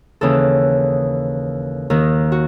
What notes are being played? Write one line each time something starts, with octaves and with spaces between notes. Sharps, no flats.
D#2 C#3 E3 A4
D#2 D#3
F#4